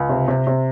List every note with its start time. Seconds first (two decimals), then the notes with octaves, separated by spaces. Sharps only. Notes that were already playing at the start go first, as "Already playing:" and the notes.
Already playing: C#2
0.09 C3
0.28 C3
0.47 C3